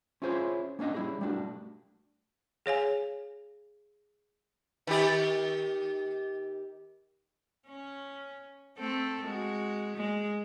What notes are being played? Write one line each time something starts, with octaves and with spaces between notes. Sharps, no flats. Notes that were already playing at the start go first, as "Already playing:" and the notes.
C#4 E4 F4 G#4 C5 C#5
A#3 C#4 D4 D#5 F#5
G3 E4 G#4
G3 A3 D4 F#4
G#4 C#5 F5 G#5
D#3 G4
C#4
A3 C4 A4
G#3 F#4
G#3